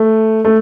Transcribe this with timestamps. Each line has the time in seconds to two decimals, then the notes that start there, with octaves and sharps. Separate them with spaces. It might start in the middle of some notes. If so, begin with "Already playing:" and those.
Already playing: A3
0.45 A3